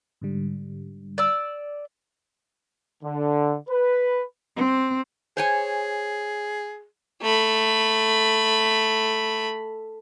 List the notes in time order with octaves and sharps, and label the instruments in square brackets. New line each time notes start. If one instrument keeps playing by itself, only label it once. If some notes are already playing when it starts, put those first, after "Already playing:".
[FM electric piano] G#2 D3 G3
[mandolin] D5 E6
[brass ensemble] D3
B4
[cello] C4
[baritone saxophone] G#4 [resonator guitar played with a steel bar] C5 C#5 G#5
[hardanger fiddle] A3 B5